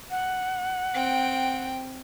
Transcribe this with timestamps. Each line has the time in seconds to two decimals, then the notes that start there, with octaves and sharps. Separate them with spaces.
0.11 F#5
0.94 C4 G5